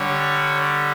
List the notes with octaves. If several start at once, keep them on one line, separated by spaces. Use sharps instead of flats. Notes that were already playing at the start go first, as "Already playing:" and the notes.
Already playing: D3 G3 C#5